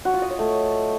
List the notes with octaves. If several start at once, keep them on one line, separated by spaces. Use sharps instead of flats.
F#4
F4
D#5
C#5
A3